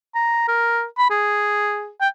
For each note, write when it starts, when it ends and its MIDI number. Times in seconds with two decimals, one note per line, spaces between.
0.15 0.46 82
0.48 0.84 70
0.98 1.10 83
1.10 1.89 68
2.01 2.08 79